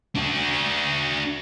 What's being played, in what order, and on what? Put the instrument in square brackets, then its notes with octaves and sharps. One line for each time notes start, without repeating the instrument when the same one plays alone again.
[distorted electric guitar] D4 F#4